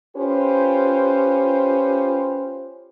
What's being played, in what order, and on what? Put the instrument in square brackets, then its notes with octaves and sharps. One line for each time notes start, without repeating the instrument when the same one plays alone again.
[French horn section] C#4 F4 G4 B4 C5